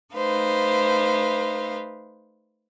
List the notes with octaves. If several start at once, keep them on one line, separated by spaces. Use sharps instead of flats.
A3 D#4 B4 C5 F5